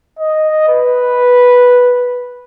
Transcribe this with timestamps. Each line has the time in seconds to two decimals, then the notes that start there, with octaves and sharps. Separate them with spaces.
0.19 D#5
0.68 B4